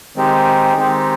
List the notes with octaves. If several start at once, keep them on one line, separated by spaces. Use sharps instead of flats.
D#3 G#3 C4 D#4 G4
D#3 G#3 C4 D#4 G4